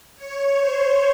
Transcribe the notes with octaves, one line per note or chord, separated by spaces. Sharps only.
C#5
C5